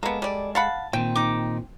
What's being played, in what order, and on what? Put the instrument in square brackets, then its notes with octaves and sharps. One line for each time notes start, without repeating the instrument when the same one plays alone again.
[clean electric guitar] G#3 A4 [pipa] A#3 B3
[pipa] G3 D5
[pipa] F5 F#5 B5 [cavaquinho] A5
[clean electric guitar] A#2 D#3 C4 [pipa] G5
[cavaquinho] D#4 D6